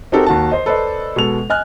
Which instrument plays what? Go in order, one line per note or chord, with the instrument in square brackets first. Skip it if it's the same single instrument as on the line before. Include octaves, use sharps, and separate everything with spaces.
[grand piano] C4 D#4 F#4 G4 A4 A#4
D#2 F#4 A5
C5 D#5
A4 B4 C5 D5 D#5
B2 G#3 A4 F7
D#5 G#5 F6 F#6